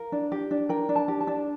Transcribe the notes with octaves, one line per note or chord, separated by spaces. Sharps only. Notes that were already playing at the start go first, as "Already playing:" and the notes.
Already playing: A#4 F5
D4
G4
D4
A#4 G5
D4
A5
G4
A5
D4